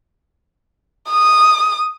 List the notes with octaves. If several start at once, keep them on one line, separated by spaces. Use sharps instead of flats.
D#6